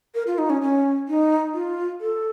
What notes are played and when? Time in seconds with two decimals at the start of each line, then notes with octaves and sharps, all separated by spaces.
0.15 A#4
0.27 F4
0.38 D#4
0.50 C#4
0.62 C#4
1.08 D#4
1.54 F4
2.01 A4